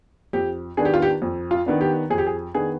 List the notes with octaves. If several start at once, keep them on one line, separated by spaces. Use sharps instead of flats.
F2 G4
D#3 B3 D4 G#4
G4
F4
G4
F2
F4
D#3 B3 D4
G4
F2 G#4
G4
G#4
D#3 B3 D4 G#4